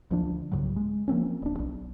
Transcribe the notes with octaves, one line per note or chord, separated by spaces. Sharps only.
D2 F3 D4
C2 G2 C#3 F#3
G#3
F3 A#3 C4 C#4
D#1 D4
B1